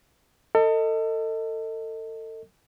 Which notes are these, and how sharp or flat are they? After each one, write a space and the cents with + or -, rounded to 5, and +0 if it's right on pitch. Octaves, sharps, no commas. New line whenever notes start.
A4 +35 D#5 +10